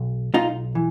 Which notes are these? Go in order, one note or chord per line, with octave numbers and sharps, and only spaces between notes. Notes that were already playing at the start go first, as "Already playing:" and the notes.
Already playing: B1
B1 D#4 F4
E3